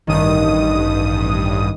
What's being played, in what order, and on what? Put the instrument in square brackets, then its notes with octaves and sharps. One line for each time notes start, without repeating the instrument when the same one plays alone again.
[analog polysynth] A1 G2 D#6 [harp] D#3